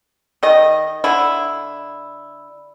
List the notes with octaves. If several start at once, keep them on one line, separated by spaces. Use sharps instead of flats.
D#3 D#5
D3 E4